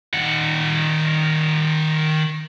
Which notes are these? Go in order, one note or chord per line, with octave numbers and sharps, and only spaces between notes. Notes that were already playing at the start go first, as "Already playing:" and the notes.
D#3 F#5